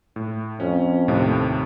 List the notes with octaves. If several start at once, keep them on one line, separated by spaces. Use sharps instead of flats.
A2
F2 C#4
D#2 A2 C3